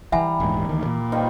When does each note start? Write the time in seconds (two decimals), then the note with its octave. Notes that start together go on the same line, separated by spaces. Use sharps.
0.12 E3 G3 E5 F#5 G#5 A#5
0.40 D#1 G#2
0.69 D2 D#3
0.86 A#2
1.12 D#3 F3 G3